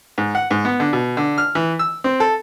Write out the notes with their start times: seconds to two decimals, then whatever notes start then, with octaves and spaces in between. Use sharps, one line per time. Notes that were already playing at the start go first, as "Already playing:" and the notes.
0.18 G#2
0.35 F#5
0.51 G#2
0.65 B3
0.80 D3
0.93 B2
1.17 D3
1.38 F6
1.55 E3
1.79 E6
2.04 C4
2.20 A4